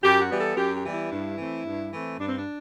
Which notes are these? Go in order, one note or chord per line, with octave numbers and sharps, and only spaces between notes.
F#2 G4
F#4
E3 G3 B3
A4
F#2 G4
G4
E3 G3 B3
E4
G2
E3 A3 C4
G2
E3 A3 C4
G2 D4
C4
D4